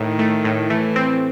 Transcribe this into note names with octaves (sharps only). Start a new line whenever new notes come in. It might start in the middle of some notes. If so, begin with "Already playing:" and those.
Already playing: A2 D#3
A3
A2
E3 A3
C4